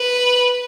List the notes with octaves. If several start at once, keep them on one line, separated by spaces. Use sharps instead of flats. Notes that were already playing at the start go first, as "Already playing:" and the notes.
Already playing: B4